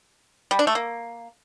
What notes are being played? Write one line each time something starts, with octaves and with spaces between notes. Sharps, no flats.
G3
D4
A3
A#3